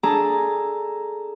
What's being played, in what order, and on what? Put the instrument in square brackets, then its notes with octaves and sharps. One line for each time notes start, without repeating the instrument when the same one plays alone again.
[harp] D4 G#4 A4 A5 A#5